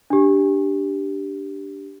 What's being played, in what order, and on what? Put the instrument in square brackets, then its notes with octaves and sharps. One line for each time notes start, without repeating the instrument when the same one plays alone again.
[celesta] D4 G4